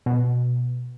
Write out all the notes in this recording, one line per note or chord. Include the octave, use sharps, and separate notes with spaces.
B2